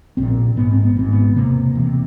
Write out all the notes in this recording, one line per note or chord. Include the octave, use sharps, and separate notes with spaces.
A#1 A#2 C4
G#1 G#2 B3
C4
B3
G#1 G#2 C4
B3
E1 E2 C3 A#3
E1 E2 C3